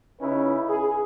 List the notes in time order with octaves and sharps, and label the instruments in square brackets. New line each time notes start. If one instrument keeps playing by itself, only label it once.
[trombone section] C#3 C#4 D#4 E4 B4
G#4